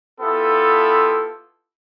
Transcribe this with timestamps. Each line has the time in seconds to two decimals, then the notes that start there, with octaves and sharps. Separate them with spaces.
0.21 B3 E4 F4 G4 A4